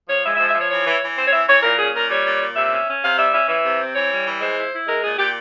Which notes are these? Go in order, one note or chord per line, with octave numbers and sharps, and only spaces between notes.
F3 C#5
G#3 E5
E5
F3
E5
F3 C#5
E3 C#5
E3
E3
C4 C5
C#5
E3 E5
E3 C#5
A#2 A#4
C#4 G#4
A#2 A#4
G3 C#5
A#2
A#2
C3 E5
C#4
C#4
C3 F5
G3 E5
C#4 E5
E3 E5
C3
C4
E3 C#5
G3
E3
G#3 C5
E4
E4
G#3 A#4
A#2 G#4
A#2 G4